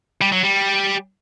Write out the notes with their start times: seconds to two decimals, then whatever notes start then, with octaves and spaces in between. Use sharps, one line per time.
0.21 G3
0.32 F#3
0.44 G3